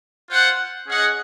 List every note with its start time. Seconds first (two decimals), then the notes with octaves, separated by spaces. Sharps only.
0.30 F4 C5 F#5
0.87 C#4 G#4 D#5 F#5